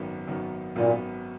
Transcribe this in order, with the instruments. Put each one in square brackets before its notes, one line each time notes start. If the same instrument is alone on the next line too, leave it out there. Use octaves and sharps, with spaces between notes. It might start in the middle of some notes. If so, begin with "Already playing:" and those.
Already playing: [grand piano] G#1 F#2 D#3 F#3 B3
G#1 F#2 D#3 F#3 B3
[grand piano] G#1 F#2 D#3 F#3 B3 [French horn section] A#2